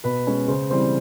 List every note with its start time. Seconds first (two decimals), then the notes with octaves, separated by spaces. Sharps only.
0.04 B2 B4 B5
0.27 G#3 C#4
0.48 C#3 C5 C6
0.70 E3 G3 C4 C5 C6